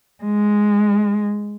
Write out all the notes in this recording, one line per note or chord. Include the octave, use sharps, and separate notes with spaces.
G#3